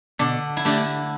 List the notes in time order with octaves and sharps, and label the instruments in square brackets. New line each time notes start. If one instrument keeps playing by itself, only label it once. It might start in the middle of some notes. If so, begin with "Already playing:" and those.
[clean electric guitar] B2 [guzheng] D3 D4
[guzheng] E4
[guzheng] D3 D4 [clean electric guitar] A3 G4 D5